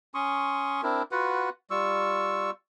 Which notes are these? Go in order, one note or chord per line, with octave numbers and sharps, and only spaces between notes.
C#4 C6 C#6 D#6
C4 D4 E4 A#4
F4 F#4 B4 F#5
G3 F4 C#6 E6